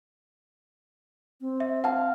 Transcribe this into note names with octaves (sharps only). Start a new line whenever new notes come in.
C4
E5
F5 F#5 A5